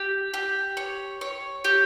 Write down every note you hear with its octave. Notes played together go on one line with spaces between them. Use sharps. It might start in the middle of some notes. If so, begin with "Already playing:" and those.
Already playing: G4
G4
C#5
C#5
G4